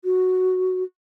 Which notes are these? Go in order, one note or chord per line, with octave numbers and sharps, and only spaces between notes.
F#4